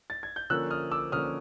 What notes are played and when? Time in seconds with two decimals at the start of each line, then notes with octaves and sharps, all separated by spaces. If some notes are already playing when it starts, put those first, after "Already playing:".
0.10 A6
0.23 G#6
0.36 G6
0.50 D3 F3 A#3 C#4 E6 F#6
0.70 D#6 F6
0.91 D6 E6
1.12 D3 F3 A#3 C#4 D#6 F6